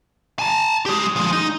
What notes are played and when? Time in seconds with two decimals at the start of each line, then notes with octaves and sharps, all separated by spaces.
0.39 G#5 A5
0.86 G#3 G4
1.16 F3 G#3
1.33 D#4